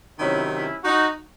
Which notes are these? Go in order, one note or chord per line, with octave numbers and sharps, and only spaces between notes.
C3 D#3 F#3 C#4 E4
C#4 E4
D#4 F#4